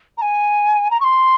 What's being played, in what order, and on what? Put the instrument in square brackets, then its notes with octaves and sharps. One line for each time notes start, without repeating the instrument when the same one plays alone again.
[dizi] A#5
G#5
A#5
C#6
C6